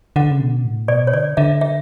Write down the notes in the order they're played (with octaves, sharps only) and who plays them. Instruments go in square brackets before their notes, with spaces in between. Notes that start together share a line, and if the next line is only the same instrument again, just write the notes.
[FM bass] D3 [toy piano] F#5
[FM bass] C#3
B2
A2
[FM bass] B2 [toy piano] D5
[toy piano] C#5
[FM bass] D3 [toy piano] D5
[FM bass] D3 [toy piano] E5
[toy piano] E5